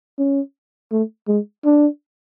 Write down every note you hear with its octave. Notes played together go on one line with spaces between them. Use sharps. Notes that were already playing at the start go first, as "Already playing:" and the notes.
C#4
A3
G#3
D4